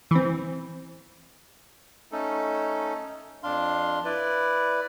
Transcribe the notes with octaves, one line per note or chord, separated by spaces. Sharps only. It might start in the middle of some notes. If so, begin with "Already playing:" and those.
E3 C4
A3 C#4 D#4 A4
F2 D4 F5 C6
E4 B4 D5